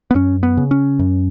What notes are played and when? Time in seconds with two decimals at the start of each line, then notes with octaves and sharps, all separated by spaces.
0.11 B3
0.15 F#2 C#4
0.43 B3
0.57 C#3
0.71 C#4
0.99 F#2